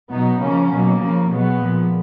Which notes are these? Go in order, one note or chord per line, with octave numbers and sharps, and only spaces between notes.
B2 F#3 B3 D#4
C#3 F3 A#3 C#4
B2 F#3 A#3
C#3 F3
B2 F#3 G#3 B3
A#2 F3